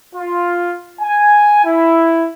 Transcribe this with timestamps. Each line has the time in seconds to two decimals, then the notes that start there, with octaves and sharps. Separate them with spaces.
0.15 F4
1.01 G#5
1.65 E4